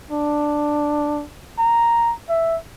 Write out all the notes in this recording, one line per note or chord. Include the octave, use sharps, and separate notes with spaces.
D4
A#5
E5